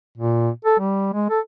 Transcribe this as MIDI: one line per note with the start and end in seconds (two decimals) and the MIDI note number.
0.18 0.49 46
0.65 0.77 69
0.79 1.13 55
1.13 1.26 56
1.29 1.39 69